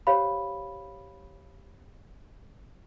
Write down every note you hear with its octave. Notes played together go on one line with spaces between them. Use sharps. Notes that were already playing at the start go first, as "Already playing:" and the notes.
G4 C5 C#5 F5 B5